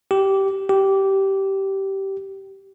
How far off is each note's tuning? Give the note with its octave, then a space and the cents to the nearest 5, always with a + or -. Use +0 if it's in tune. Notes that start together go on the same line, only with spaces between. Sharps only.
G4 -15
G4 -15